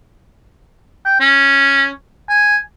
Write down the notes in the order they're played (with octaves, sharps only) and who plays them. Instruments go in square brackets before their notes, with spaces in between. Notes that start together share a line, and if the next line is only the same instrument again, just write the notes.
[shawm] G5
C#4
G#5